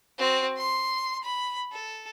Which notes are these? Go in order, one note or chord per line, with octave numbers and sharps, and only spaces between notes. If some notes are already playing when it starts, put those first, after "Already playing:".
C4 F#4
C6
B5
A4